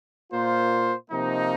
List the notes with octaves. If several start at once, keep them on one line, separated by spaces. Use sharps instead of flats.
A#2 A#3 F4 C5
C3 F3 A#3 D#4